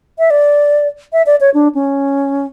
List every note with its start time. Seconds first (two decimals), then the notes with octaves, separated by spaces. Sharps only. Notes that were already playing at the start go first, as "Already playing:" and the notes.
0.19 E5
0.30 D5
1.13 E5
1.26 D5
1.41 C#5
1.54 D4
1.75 C#4